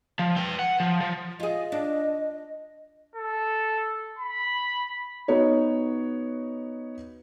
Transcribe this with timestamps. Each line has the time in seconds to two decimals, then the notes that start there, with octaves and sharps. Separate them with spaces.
0.19 F3
0.37 B4 G5
0.59 F#5
0.80 F3
1.01 F3
1.40 F4 G#4 D#5
1.72 D4
3.16 A4
4.19 B5
5.28 B3 D#4 F#4 C#5